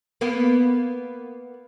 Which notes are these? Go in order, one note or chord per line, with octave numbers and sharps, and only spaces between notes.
A#3 B3